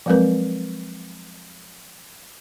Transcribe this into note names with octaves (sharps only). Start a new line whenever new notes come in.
F3 F#3 G#3 C4 A#4 B4